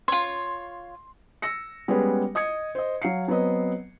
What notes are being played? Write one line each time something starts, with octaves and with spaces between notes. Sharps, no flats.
F4 C#5 C6
E6 A#6 C#7
G3 G#3 B3 C#4 G#4 B4
D#5 D#6 G#6 C#7
C5 D#5
F#3 F5 C7 C#7
F#3 B3 C4 B4 D#5